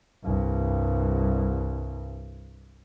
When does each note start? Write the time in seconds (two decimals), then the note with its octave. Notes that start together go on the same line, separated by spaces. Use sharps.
0.24 C2 G2